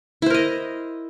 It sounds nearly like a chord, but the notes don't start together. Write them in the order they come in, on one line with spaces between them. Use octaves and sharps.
E4 C5 A#4 D#5